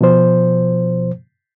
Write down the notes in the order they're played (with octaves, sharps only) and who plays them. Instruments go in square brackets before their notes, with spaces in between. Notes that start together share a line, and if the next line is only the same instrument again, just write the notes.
[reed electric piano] B2 F3 C5